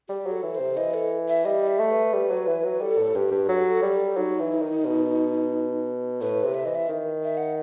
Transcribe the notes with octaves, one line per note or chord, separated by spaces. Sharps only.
G3 G4
F#3
A4
E3
C5
C3
E3 D#5
A4
E5
G3 D#5
E5
A3
B4
G3
F#3
E3
F#3
G3 A4
A2
G2 G4
G2
F#3 A4
G3
F#3 D#4
E3
D#3
B2
A2 B4
C3
E5
E3 D#5
E5
D#3
E5
F#5